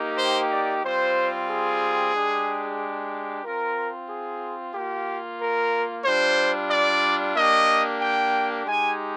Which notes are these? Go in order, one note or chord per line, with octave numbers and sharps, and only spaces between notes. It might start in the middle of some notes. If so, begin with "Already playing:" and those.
Already playing: A#3 D#4 G4
C5
D5
G3 C4 F4 C5
G#4
G#3 D4 G4
C4 F4 A#4
G#4
A#3 F4 G4
A#4
G3 D4 F4 C5
D5
A#3 D4 G4 D#5
G5
G#3 D#4 G4 G#5